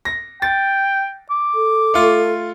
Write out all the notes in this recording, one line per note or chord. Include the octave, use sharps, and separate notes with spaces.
A#6
G5 A6
D6
A4
A3 F4